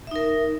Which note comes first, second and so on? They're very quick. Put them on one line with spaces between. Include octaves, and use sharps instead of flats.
E5 D#4 A#4